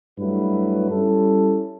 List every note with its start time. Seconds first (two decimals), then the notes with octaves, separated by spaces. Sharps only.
0.17 G2 F#3 A3 E4 B4
0.90 G3 C#4 E4 A4